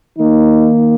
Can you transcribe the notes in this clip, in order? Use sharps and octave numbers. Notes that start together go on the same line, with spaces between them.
D#3 A#3 D#4